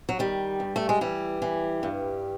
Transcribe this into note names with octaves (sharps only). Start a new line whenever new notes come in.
F#3
D#3 G3
G2
A3
G#3
E3 G3
E3
G2